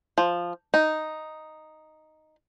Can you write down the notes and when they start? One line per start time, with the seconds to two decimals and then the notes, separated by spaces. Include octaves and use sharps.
0.18 F3
0.74 D#4